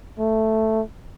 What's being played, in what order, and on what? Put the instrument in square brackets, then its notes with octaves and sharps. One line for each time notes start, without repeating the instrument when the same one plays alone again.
[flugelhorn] A3